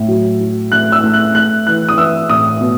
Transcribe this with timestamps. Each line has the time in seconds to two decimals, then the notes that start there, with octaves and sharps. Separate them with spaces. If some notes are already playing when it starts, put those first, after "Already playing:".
Already playing: A2
0.08 F#3
0.40 F#3
0.71 A3 F#6
0.92 E6
1.04 A3
1.13 F#6
1.35 A3 F#6
1.67 E3 F#6
1.89 D#6
1.98 E3 E6
2.30 A2 D#6
2.61 B2